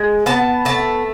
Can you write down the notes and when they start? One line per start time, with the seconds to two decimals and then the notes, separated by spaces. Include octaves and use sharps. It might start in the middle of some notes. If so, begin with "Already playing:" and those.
Already playing: G#3
0.26 B3 A5
0.65 A3 A5